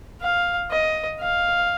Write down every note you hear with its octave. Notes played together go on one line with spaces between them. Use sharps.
F5
D#5
F5